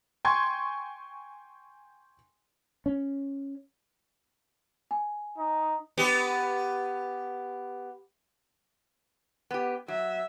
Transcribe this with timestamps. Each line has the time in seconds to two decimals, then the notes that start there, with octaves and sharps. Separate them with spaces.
0.25 G5 G#5 C6 C#6 G#6
2.86 C#4
4.91 G#5
5.38 D#4
5.97 B3 G4
9.51 B3 G4
9.88 F#3 E5